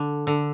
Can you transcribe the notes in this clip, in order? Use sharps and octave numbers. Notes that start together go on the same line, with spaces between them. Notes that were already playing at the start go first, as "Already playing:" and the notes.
Already playing: D3
D3